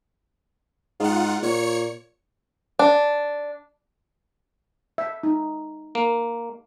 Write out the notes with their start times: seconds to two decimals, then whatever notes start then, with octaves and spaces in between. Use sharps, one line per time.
1.00 G#2 F4 F#5
1.43 A#2 C#5 C#7
2.79 D4
4.98 E5
5.23 D#4
5.95 A#3